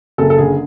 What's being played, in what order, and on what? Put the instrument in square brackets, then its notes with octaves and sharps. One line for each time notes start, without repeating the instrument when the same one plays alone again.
[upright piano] F#1 A4
A4
D3 G#4